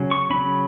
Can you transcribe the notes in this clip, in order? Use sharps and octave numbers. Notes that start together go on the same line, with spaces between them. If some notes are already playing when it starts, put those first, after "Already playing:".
Already playing: C#3 F#3 C#4
C#6
C#3 F#3 C#4 B5